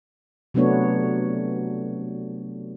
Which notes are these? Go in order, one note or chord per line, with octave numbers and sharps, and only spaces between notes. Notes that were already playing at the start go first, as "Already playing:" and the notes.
C3 F#3 A3 B3 D4 C#5